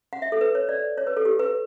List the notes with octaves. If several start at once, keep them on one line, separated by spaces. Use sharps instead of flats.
F#5
E5
A4
B4
C#5
D5
C#5
B4
A4
G4
B4